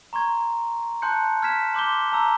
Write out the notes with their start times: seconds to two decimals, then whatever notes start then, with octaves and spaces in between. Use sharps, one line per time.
0.13 A#5 C6 C#6 G#6
1.02 A5 C6 F#6 G6 C#7
1.42 F6 G#6 B6 E7
1.74 C6 D6 G6 G7
2.12 A5 A#5 E6